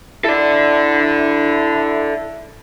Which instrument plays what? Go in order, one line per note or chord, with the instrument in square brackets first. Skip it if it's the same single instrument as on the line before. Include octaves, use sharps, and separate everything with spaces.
[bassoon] E4 [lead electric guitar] A4 D5